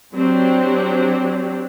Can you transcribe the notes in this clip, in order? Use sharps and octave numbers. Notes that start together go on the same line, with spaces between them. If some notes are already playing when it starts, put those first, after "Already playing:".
F#3 C4 D4 G4